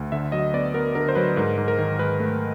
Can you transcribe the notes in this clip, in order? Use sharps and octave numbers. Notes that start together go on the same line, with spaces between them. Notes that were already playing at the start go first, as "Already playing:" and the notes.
Already playing: D2
D3 E5
F#3 D#5
B3 D5
B3 A#4
D3 A#4
C5
F#3 B4
G#2 A#4
G#2
A#4
D#3
G#2 B4
A3